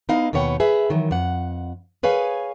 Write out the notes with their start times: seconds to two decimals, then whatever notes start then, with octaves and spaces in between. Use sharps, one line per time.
0.09 B3 D#4 E4 D#5 F5
0.33 D#2 B2 B4 C#5 F#5 G5
0.60 G#4 B4 E5
0.90 D#3 E3 F#3
1.11 F2 F#5
2.03 G#4 B4 C#5 F5 G#5